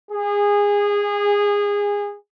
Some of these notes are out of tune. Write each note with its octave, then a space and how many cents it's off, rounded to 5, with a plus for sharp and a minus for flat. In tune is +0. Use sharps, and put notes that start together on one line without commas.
G#4 -25